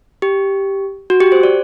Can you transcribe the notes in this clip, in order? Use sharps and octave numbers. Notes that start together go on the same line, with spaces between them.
G4
F#4
G4
C5
D5